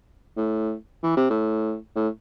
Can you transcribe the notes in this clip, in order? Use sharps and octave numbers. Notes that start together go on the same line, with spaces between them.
A2
E3
C3
A2
A2